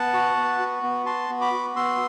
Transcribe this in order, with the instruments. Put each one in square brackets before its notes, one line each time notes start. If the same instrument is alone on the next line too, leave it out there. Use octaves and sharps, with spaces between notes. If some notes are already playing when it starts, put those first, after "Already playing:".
Already playing: [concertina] B3 F#5 A5
F#4
B3
F#4
B3
F#4 A5 C6
B3
B5 D6
F#4
B3 C6 E6